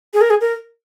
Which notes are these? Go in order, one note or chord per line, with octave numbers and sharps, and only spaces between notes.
G#4
A#4
G#4
A#4